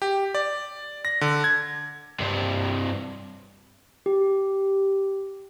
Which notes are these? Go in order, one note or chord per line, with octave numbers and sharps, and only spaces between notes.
G4
D5
A#6
D3
G#6
G2 C3
G4